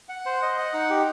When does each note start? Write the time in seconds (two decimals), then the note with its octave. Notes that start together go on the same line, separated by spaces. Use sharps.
0.09 F#5
0.26 C5
0.42 D#5
0.58 F#5
0.73 D#4
0.90 G4